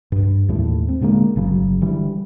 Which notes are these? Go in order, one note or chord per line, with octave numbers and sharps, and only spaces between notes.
G2
D#2 A2 E3 A3
C4
A#2 D3 G#3 A#3
G1 C#3 F#3
D3 E3 G3